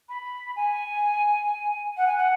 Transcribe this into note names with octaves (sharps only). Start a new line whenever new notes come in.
B5
G#5
F#5
G#5
F#5